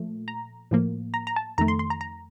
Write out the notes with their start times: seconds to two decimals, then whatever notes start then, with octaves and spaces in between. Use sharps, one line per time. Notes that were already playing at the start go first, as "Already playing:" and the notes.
Already playing: A#2 F3 A3
0.28 A#5
0.71 A2 F3 A#3
1.14 A#5
1.27 A#5
1.36 A5
1.58 F2 D#3 A3 A#5
1.68 C6
1.79 C6
1.90 A#5
2.01 A#5